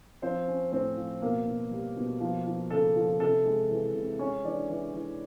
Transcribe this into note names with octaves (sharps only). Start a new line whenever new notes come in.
F3 C4 C5
C#4
A2 C4 C5
F3
B2 A#3 A#4
B2
G3
B2
F3
F3
C#3 A4
F3
C3 A4
G#3
E3
C3
G#3 C#4 C#5
E3 D4 D5
E3
E3